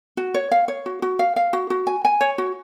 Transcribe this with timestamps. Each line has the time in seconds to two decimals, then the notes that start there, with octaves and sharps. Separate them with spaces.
0.17 F#4
0.34 C#5
0.51 F5
0.68 C#5
0.86 F#4
1.02 F#4
1.19 F5
1.36 F5
1.53 F#4
1.70 F#4
1.87 G#5
2.05 G#5
2.21 C#5
2.38 F#4